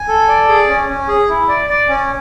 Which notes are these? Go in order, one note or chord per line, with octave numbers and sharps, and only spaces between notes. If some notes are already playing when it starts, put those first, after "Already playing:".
Already playing: G#5
A4
D5
G#4
C#4
C#4
G#4
E4
D5
D5
C#4